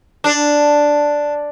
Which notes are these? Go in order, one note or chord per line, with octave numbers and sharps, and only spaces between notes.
D4